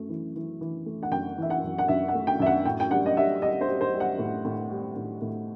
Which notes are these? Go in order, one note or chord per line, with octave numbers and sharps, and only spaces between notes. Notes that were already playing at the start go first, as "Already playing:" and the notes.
Already playing: F#2 A3
E3
E3
E3
A3
F#5
F#2 G5
E3 E5
F#5
F#2
F#5
F#2 E5
F#5
A3
G5
F#2 E5
F#5
A2 G5
G5
G3 F#5
D#5
G3 E5
G3 D#5
C5
G3
C5
G3
F#5
A2
A2
G3
A2
A2